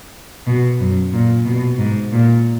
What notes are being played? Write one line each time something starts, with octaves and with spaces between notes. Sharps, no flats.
B2
F#2
A#2
B2
G#2
A#2